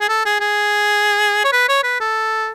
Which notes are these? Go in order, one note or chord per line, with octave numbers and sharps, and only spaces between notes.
G#4
A4
G#4
G#4
C#5
B4
C#5
B4
A4